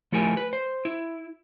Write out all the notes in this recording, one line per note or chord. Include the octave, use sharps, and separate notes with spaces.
F3 A3 E4 G4 A#4 G#5
B4
C5
E4